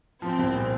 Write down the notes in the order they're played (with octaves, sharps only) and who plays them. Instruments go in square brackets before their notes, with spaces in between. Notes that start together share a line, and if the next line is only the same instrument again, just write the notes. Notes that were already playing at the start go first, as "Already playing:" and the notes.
[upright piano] F3 [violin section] C4
[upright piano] C2
A#2